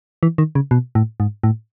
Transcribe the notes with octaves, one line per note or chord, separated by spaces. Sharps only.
E3
D#3
C#3
B2
A2
G#2
A2